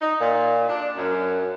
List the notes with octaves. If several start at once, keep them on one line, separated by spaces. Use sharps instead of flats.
D#4
A#2
D4
F#2